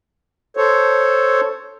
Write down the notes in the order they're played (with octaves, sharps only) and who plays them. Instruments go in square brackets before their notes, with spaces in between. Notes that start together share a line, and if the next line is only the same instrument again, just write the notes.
[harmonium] A4 C5 C#5